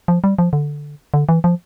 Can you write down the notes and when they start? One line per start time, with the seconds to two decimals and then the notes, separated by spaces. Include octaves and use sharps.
0.08 F3
0.24 G3
0.39 F3
0.53 D3
1.14 D3
1.29 E3
1.44 F3